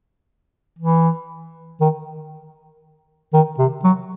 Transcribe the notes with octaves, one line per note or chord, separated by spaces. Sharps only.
E3
D#3
D#3
C3
F#3